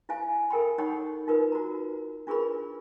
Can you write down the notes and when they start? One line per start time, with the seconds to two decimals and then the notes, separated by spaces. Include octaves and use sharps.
0.09 E4 C5 F5 G#5
0.50 A4 A#4 G5 B5
0.78 D#4 C#5 F#5 G5 B5 C#6
1.27 D#4 F4 A#4 B4
1.52 F#4 A#5
2.27 D4 F4 G#4 A#4 B4 B5